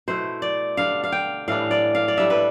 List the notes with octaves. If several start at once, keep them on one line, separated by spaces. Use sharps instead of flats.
B2 A3 E4 C5
D5
D3 G3 D4 F5
F5
G5
A2 E3 G3 D4 F5
D5
F5
D5
A2 G3 D4 E5
B4